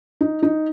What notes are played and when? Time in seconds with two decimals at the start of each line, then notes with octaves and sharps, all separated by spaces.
0.21 D#4
0.43 D#4